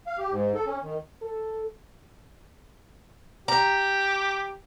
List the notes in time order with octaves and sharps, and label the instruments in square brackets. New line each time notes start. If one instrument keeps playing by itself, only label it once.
[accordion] F5
G4
G#2
A4
C#4
D#3
[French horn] A4
[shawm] G4 [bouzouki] A#5